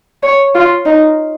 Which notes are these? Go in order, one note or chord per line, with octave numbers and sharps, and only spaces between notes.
C#5
F4
D#4